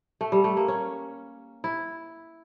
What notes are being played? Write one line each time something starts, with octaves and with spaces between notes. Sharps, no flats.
A3
G3
A3
A#3
C#4
E4